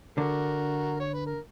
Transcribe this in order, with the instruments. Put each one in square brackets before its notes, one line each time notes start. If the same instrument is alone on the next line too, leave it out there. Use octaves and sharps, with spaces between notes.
[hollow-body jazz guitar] D3 [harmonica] F#4 A#4
[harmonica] C#5
B4
A#4